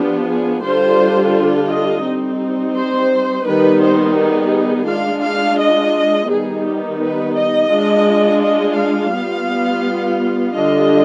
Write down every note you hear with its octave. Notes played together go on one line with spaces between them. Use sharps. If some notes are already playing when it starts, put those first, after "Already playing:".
Already playing: F3 B3 D4 F4 G4
G#4
D3 G3 D4 F4 C5
D#5
G3 C4 D#4
C5
D#3 G3 B3 D#4 B4
C5
G#4
G#3 D4 F4 F5
F5
D#5
D#3 G3 B3 D#4 G#4
G4
B4
D#5
G#3 D4 F4
D#5
F5
G3 B3 F4
D3 G3 D4 F4 D#5